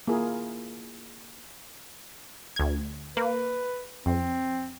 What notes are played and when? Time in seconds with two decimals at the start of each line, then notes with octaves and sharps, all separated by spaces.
0.08 A#3 E4 F4 G#4 A#4
2.56 D2 G#6
3.17 A#3 B4
4.06 F2 C4